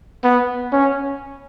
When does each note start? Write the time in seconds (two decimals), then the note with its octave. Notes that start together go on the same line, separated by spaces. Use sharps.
0.24 B3
0.73 C#4